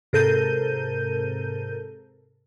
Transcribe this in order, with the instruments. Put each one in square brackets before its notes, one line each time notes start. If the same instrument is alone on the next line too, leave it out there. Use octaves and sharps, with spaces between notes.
[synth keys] G#2 C3 A4 A#4 G6 D#7